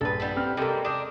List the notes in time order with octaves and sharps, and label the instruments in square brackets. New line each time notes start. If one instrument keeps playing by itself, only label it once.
[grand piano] A#1 G2 [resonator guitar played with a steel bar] A4 B4
[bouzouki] G3 B3 E4
[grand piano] C4 G5 F6
[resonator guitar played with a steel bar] C3 G#3 [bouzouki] G3 A#3 [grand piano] A4 A#4
[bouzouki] D4 A#4 [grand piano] D6 D#6 G6